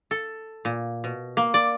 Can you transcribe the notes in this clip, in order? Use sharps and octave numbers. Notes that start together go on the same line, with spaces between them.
A4
A#2
B2
A#3
D5